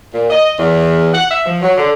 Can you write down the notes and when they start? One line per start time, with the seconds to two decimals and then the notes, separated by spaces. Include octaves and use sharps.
0.14 A#2
0.29 D#5
0.59 E2
1.14 F#5
1.30 E5
1.45 F3
1.62 F#3
1.77 D3